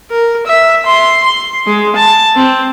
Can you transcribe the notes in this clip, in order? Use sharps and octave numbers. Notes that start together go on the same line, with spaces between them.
A#4
E5
C6
C6
G#3
A5
C4